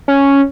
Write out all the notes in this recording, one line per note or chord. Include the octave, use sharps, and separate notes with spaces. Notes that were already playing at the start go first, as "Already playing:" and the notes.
C#4